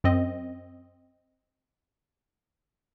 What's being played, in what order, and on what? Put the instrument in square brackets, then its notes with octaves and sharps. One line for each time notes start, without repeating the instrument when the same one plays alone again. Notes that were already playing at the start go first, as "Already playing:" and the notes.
[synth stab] F#2 C4 D#5